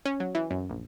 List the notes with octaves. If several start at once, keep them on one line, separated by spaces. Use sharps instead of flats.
C#4
F#3
E3
F#2
A#1